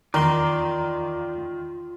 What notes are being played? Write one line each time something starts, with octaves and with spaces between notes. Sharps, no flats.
E2 D#3 F4 D5 A#5 C6